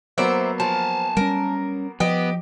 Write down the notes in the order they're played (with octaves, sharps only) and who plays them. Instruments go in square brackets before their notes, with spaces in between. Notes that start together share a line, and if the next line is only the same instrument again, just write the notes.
[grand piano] F#3 A#3 B3 [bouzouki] C5 D5 E5
[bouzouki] F3 [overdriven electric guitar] G#5 A5
[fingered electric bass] G3 G#3 C#4 [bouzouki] A#4
[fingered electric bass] F3 [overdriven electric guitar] B3 [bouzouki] G4 [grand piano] D#5